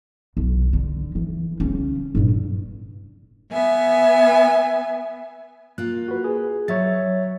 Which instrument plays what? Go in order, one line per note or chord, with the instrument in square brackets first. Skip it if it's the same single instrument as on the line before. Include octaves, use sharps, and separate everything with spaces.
[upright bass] B1
D3
E3
C#3 C#4
G2 A#2
[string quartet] B3 E5 G#5
[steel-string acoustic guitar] A#3 F4 [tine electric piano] F#6
[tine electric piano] F#4 B4
G#4
[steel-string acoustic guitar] F#3 [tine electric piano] C#5 E5 A6